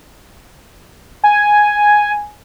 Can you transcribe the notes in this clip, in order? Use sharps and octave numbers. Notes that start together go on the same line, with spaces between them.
G#5